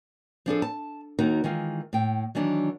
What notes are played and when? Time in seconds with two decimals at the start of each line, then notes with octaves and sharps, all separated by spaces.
0.46 F3 D4 G#4 A4
0.62 A5
1.19 D#2 D#3 D#4 F#4 A#4
1.44 D#3 E3 G#3 F4
1.93 A2 G5
2.35 D#3 E3 F#3 D4 E4